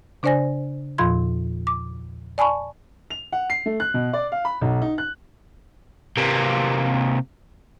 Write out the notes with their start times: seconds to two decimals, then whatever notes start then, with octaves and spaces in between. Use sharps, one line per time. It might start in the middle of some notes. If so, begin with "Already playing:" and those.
0.23 C#3 D4 C5 D5 G#5 A#6
0.98 E2 A#2 F3 F4 C6 G#6
1.67 D6
2.38 D5 G#5 A5 B5 C#6
3.10 F7
3.32 F#5
3.50 C7
3.66 A3
3.80 F#6
3.94 B2
4.13 D5
4.32 F5
4.45 B5
4.61 B1
4.82 D#4
4.98 F#6
6.17 C3 A#3